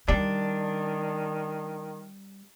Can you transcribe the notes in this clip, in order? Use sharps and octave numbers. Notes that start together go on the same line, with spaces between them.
D#3 G3 C#4 D4